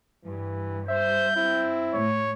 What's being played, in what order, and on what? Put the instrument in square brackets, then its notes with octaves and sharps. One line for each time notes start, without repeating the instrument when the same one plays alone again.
[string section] G2 [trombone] E3
[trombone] C5 [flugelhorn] E5 [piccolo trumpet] G6
[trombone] C4 [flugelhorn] E4
[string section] A2 [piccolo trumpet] C#5